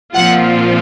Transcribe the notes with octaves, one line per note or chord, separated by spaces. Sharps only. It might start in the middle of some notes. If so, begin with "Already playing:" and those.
A#2 F3 C4 F4 F#5